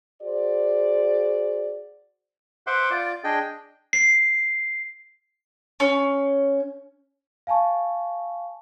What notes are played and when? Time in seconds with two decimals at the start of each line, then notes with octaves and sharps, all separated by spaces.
0.21 F#4 G#4 C5 D5
2.67 B4 C5 E5 F#5 C6 D6
2.91 F4 D5 D6
3.24 D4 G#4 D#5 G5
3.93 C7
5.80 C#4
7.47 F5 G#5 A5 C#6